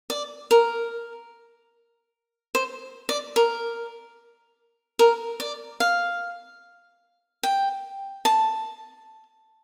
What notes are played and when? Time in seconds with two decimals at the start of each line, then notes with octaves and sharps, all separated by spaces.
0.10 D5
0.51 A#4
2.55 C5
3.09 D5
3.36 A#4
4.99 A#4
5.40 D5
5.80 F5
7.43 G5
8.25 A5